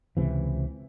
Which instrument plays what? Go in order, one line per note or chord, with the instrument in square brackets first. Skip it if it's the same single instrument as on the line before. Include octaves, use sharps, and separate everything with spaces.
[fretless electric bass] C#2 C3 E3